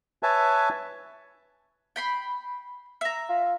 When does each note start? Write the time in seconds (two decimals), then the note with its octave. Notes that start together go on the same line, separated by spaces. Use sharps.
0.23 B4 C#5 E5 G#5 A5
1.96 G5 B5 C6
3.01 E5 A#5
3.29 F4